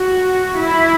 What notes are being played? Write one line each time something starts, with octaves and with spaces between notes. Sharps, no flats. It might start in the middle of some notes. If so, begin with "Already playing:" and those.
Already playing: F#4
E4